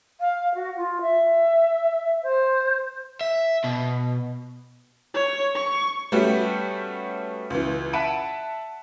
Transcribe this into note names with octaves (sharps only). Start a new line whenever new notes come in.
F5
F#4
F4
E5
C5
E5
B2
C#5
C#6
G3 A3 B3 C#4 F#4 G4
C#2 E3
E5 F#5 A5 B5 D7 D#7